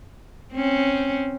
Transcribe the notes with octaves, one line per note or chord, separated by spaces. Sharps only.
C4 C#4